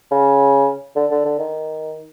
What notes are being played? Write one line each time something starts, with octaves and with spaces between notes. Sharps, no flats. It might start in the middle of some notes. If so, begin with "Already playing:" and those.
C#3
D3
D3
D3
D#3